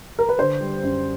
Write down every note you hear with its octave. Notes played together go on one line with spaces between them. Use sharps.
A#4
B4
D3 C5
G3
F#2